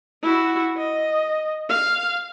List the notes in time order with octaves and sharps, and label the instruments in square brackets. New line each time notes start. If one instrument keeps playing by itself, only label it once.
[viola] E4 F#4
D#5
F5